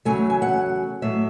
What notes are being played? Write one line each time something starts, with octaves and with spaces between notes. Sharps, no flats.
E2 C#3 F#3 A3 G#5
G#5
F#5
A2 F#3 A3 E5